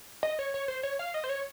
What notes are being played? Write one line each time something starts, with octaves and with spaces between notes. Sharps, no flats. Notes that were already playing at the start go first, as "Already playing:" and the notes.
D#5
C#5
C#5
C5
C#5
F5
D#5
C5
C#5